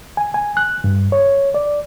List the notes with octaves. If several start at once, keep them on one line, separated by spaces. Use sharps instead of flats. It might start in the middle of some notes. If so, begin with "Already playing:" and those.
G#5
G#5
F#6
G2
C#5
D5